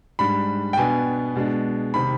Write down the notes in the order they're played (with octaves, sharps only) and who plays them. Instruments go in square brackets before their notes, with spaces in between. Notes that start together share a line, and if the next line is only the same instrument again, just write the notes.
[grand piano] G#2 G3 D4 B5
G5
B2 B3 D4 G#5
B2 G#3 D4
C3 D#3 B5